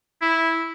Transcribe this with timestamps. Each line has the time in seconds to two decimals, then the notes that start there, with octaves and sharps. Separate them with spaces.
0.22 E4